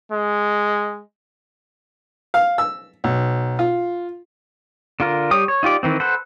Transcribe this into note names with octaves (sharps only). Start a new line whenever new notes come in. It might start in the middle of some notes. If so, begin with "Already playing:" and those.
G#3
F5
E6
B1
F4
D3 F4 A#4
G3 G4 C#5 D#6
C#5
D#4 F4 G4 D5
D#3 E3 C4
A4 B4 C5 F#5